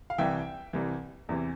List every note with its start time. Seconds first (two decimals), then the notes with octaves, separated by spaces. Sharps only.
0.10 F5
0.18 C2 C3 E3 E5 G5
0.73 C2 C3 E3
1.29 E2 C3 E3